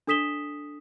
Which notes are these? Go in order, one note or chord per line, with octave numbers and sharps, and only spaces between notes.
D4 A4 D#6 B6 E7 G7